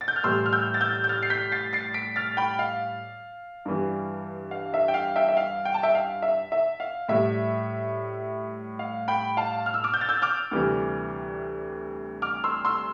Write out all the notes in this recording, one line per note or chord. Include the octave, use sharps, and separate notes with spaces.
A6
G6
F6
A2 E3 G3 C6 E6
F6
E6 G6
A6
E6 G6
G6
F6 A6
C7
G6 B6
A6 C7
A6 C7
B6 D7
F6 A6
G5 B5
F5
G2 E3 G3
F5
E5
G5
F5
E5 G5
E5
F5
G5
A5
E5 G5
F5
E5
E5
F5
A2 G3 E5
F5
G5 B5
F5 A5
F6
E6
D6 F6
G6
A6
E6 G6
D6 F6
D2 C3 E3 G3
D6 F6
C6 E6
C6 E6